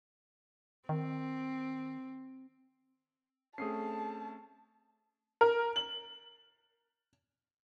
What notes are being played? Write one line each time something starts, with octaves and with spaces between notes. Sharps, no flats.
D#3 C4
A3 C4 C#4 G#4 A5 D#6 C7
A#4
F#7